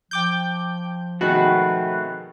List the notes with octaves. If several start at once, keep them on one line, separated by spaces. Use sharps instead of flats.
F3 G5 D6 G6
B2 D#3 G#3 A3 C4 F#4 B4